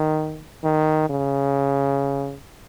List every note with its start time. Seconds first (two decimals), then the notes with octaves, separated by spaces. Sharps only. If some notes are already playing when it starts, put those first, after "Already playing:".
Already playing: D#3
0.64 D#3
1.10 C#3